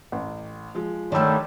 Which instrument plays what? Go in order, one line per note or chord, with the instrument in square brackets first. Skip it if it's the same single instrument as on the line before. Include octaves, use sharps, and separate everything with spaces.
[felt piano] A1
F3 G#3
[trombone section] D3 G3 [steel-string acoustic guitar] D#3 A3 [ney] C#5 [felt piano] D5 A5 E6